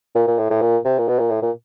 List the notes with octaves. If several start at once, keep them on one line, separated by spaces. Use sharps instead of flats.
A#2
A#2
A2
A2
A#2
C3
A#2
B2
A#2
A2
A#2